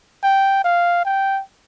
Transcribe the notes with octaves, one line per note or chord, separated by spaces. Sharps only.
G5
F5
G5